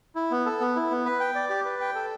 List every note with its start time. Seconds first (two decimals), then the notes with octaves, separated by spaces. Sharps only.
0.16 E4
0.31 B3
0.46 A4
0.61 B3
0.76 E4
0.91 B3
1.05 B4
1.20 G5
1.35 D5
1.50 G4
1.65 B4
1.81 G5
1.95 A4